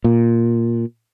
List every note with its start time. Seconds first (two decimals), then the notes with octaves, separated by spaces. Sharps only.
0.04 A#2